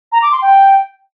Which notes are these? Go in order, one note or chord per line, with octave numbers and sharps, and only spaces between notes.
A#5
D6
C6
G5